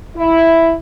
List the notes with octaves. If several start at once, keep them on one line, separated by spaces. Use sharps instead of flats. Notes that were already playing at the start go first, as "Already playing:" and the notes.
E4